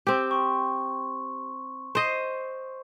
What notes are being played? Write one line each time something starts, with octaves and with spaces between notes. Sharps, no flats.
C4 G4
C6 C#6
C5 D#5